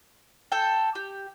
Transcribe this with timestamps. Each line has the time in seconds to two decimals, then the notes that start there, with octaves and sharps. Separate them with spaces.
0.52 A4 G5
0.95 G4